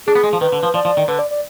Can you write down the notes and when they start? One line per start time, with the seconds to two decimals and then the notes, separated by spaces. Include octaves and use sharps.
0.07 D4 G#4
0.15 B3
0.24 G#3
0.33 F3
0.41 D#3 B4
0.52 D3
0.63 F3
0.74 F3 D5
0.85 F3
0.97 D#3
1.08 D3 B4
1.19 D5
1.31 D5